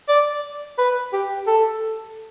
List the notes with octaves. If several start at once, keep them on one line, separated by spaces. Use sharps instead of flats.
D5
B4
G4
A4